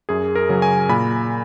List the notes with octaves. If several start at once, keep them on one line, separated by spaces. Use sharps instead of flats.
F#2 G#4
A#4
C#3 F#3 C#4
G#5
A#2 B5